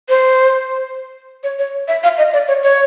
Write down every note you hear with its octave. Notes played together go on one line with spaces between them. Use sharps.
C5
C#5
C#5
E5
F5
D#5
D5
C#5
C#5